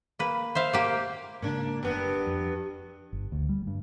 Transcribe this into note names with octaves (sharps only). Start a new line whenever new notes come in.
A#3 B4
C5 E5 F5
A#3 G4
G#2 C#3 A#3 D4
F#1 G2 B3
F2
G1
D2
G3
G2